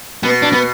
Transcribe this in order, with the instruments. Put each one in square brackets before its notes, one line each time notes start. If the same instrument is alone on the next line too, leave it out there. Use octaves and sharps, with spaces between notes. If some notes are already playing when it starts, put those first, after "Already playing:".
[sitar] B2 [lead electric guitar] B3
[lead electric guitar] D4
B3